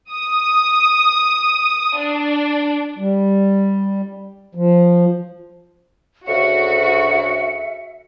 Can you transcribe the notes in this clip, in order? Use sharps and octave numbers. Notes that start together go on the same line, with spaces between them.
D#6
D4
G3
F3
D2 C#3 F#4 E5 C#7